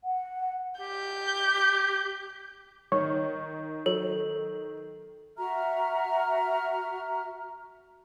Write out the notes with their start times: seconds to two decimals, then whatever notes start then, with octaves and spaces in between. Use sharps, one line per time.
0.04 F#5
0.80 G4 G6
2.92 D#3 C#5
3.86 F#3 A4
5.37 F#4 E5 A#5 F6